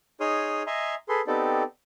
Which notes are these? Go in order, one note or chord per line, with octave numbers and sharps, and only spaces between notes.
D#4 G#4 C#5 C6 D#6 F6
D#5 E5 G#5 A#5 C6
G#4 A4 B4 C6
B3 C4 D#4 G4 A4 D5